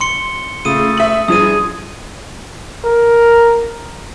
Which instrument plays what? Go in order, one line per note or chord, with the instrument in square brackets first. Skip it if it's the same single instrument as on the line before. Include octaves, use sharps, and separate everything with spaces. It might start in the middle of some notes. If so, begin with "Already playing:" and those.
[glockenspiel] C6 C#7 G7
[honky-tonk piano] C#3 F4 [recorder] A3 [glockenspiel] D#6 D#7
[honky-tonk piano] E5 F#7
[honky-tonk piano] G2 F3 [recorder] G#4 [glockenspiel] D#6 D#7
[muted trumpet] A#4